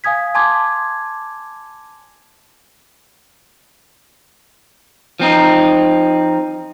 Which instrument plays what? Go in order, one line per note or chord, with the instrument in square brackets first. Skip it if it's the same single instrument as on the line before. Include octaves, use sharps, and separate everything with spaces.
[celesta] F5 G#5 D#6 G#6 B6
G#5 A5 C6 D6 G#6
[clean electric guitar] F3 C4 D#4